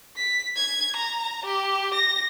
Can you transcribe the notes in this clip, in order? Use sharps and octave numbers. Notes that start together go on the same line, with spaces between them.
B6
G#6
A#5
G4
A#6